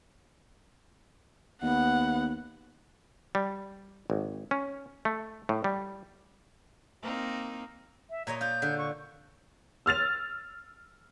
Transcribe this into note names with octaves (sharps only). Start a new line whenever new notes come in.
D#2 B3 F#5
G3
G#1
C#4
A3
A2
G3
A#3 C4 D#4
E5
A#2 C#5 D#5 A#5
F4 G6
D3
C#6
E6 F6 A6 F7